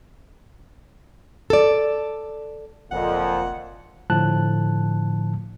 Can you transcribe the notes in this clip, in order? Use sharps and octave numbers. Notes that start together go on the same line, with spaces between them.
A4 D5
F#1 F2 A#2 F#5
A2 D3 F3 A5 F#6